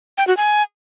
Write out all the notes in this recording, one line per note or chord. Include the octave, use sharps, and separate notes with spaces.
G5
F#4
G#5